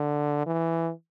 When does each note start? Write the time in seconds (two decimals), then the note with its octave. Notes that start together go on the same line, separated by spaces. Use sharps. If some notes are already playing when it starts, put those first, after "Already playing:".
Already playing: D3
0.46 E3